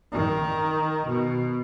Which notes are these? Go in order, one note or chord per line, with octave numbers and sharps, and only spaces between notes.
D#3
B2